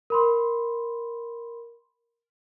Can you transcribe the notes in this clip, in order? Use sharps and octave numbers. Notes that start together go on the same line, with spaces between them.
A#4 B5 C6